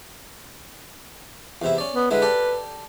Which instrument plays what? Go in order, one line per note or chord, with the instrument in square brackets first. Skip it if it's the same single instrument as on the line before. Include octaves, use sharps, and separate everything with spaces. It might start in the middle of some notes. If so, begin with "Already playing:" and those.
[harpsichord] E2 C3 E4
C#4 D5
[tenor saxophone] B3
[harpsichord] D3 G#3 E4 [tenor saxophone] B4
[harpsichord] G4 A4 D5